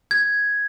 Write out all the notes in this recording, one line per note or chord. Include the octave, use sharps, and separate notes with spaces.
G#6